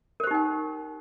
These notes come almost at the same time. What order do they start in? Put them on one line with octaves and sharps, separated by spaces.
A#4 C5 G4 D#4 G5